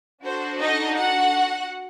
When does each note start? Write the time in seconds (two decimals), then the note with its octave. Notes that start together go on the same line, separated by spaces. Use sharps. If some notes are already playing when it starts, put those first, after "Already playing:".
0.24 D4 F#4 A4 C5
0.61 D#4 D#5
0.97 F#4 F#5